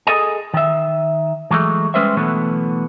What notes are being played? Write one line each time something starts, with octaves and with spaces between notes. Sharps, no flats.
G#4 A4 D#5 G#5
D#3 E5
E3 F#3 G#3 A3
G3 G#3 C#4 B4 C5 E5
B2 D3 E3 F#3 A3 B3